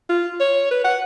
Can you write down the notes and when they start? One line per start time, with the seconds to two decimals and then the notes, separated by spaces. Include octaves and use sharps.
0.09 F4
0.40 C#5
0.71 B4
0.84 F#5